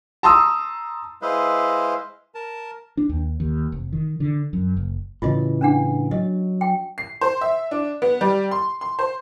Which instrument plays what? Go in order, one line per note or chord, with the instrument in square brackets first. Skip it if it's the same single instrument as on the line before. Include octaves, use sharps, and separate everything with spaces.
[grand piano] A5 A#5 C6 D#6 E6
[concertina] G#3 E4 B4 C5 D#5 F5
A#4 A5
[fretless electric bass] D4
D#2
D#2
F1
D#3
D3
F#2
F#1
[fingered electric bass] A2 C#3 E3 [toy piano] F4 D#5
[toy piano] C#4 D4 F#5
[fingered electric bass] F#3 [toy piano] D#5
[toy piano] G5
[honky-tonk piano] C7
C5
E5
D4
B3
G3
C6
C6
C5